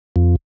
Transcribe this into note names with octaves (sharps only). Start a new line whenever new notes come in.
F2